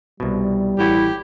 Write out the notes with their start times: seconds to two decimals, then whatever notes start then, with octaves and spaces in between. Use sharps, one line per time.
0.20 C2 B2 G3
0.79 A1 E4 F#4 G4